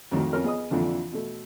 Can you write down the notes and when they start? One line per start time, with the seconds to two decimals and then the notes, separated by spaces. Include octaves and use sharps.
0.12 F2 A2 D#3 F#3
0.33 F2 C#4 F4 A#4 F6
0.44 B3 G#4 D#5 D#6
0.70 F2 A#2 D3 E3 F3 D4
1.12 B2 A3